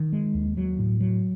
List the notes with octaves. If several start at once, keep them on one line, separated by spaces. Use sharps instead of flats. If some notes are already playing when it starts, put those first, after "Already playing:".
Already playing: D#3
G#3
D#2
F#3
A2
F#3